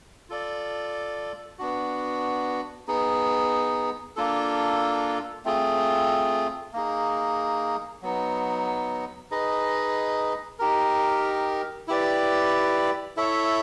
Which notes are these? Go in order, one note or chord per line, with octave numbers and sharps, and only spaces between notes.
F4 A4 D5
B3 D4 F#4
B3 D#4 G#4
A#3 D4 F4 A4
A3 C4 F4 G#4
A#3 D#4 G#4
F#3 B3 D#4
D#4 G#4 B4 D#5
D#4 G4 A#4
E4 G4 B4 D5
E4 A4 C#5 E5